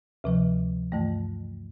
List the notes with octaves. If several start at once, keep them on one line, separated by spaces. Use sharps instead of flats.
D2 C3 F3
G2 E3 A3